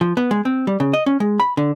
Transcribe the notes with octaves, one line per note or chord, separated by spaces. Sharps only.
F3
B3
G#3
C4
G3
C#3
D#5
C#4
G#3
B5
D3